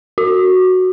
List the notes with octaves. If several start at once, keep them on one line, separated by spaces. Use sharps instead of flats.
F#4